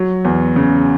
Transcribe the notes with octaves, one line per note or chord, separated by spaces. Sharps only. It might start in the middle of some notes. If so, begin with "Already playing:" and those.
Already playing: F#3
E2
C#3